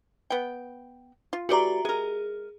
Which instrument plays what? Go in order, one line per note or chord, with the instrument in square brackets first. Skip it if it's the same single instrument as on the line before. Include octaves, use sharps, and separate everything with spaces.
[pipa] B3 G5
F4
[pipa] E3 A3 D5 [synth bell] F#4 G4 A#5
[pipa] G#3 A#4 [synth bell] G#4